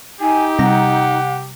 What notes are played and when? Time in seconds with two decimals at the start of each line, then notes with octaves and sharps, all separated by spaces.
0.21 D#4 G4 G#5
0.59 C3 G3 F#5 A#5